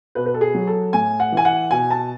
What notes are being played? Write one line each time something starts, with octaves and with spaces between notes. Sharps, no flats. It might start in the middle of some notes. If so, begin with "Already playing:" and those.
B2 B4
B4
A4
G#4
F#3
A4
A2 G#5
F#5
E3 G#5
F#5
B2 G#5
A5